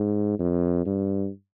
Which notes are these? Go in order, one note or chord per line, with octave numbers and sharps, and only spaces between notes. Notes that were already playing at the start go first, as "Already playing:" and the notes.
Already playing: G#2
F2
G2